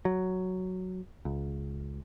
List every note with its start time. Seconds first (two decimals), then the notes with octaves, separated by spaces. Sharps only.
0.05 F#3
1.25 C#2